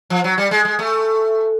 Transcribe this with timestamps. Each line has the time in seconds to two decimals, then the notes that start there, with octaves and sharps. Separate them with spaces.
0.10 F3
0.24 F#3
0.38 G3
0.51 G#3
0.65 G#3
0.79 A3